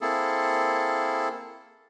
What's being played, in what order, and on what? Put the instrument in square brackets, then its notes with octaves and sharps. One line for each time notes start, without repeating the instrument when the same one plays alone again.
[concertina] A#3 C4 E4 G#4 A4